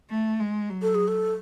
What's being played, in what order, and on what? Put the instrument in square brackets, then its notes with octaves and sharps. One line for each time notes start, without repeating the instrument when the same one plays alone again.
[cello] A3
G#3
F#3
[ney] A4
G#4
A4